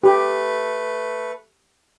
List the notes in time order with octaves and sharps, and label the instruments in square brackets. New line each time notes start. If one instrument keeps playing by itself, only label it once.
[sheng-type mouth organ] A3 B4 [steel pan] G4